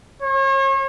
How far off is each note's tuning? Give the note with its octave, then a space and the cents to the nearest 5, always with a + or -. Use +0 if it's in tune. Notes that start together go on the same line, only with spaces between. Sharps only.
C#5 -40